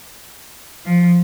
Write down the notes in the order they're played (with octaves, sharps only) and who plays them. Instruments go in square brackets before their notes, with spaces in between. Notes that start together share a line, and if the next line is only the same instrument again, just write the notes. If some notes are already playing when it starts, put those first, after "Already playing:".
[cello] F3